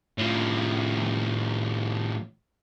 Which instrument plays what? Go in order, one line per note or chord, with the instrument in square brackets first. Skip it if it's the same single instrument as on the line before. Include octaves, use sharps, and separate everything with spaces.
[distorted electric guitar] A2 F3